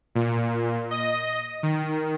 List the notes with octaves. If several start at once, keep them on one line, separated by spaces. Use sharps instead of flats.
A#2
D#5
D#3